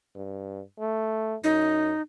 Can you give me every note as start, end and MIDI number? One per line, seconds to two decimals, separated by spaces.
0.16 0.61 43
0.80 1.35 57
1.44 1.93 42
1.44 2.02 63